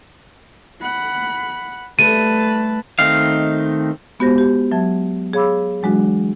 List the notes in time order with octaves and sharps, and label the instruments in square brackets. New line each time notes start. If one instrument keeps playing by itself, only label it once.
[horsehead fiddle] F#5 B5
[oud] G3 A3 [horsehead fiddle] B4 A5 [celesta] D#7
[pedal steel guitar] D#3 A3 C4 D#4 F5
[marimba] G#3 B3 F#4 G4 C5 A#6
G4
F#3 E5 A5 G#6
G#4 C#5 F5 B5 D6 E6
E3 F#3 G#3 D4 F#4